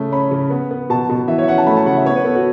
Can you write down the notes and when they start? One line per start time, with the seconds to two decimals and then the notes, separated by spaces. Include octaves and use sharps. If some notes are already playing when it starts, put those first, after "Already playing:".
Already playing: C#3 A3
0.12 C#4 B5
0.31 C#3
0.50 B3
0.71 B3
0.90 B2 A5
1.09 B2
1.28 E3 E5
1.38 C#5 E5
1.48 C#4 F#5
1.58 A5
1.67 A3 B5
1.77 A5
1.86 C#3 F#5
1.96 E5
2.06 B3 C#5
2.16 B4
2.25 B3 A4
2.35 F#4